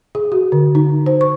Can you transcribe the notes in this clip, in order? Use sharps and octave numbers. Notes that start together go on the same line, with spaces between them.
G#4
F#4
D3
D#4
C5
C#6